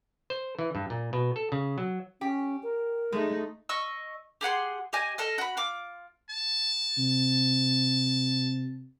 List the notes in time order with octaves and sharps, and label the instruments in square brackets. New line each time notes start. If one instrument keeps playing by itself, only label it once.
[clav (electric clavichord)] C5
E3
G2
A#2
B2
A4
C#3
F#3
[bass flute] C#4 [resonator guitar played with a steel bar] G4
[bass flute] A#4
[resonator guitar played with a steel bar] G#3 [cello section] A3 D#4
[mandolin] D#5 C#6 E6
G4 G#4 F#5 C6
G4 D#5 G#5
A4 D#5 F6
F#4 B5
F4 D6
[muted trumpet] A5
[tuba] C3